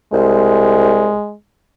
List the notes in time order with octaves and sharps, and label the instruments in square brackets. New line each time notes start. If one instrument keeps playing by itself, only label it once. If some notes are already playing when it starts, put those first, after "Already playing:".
[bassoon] C2 [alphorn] G#3